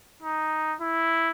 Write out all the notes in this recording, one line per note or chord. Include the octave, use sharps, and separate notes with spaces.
D#4
E4